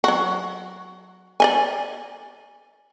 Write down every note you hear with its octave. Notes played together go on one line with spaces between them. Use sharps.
F#3 F#4
D5 D#5 G#5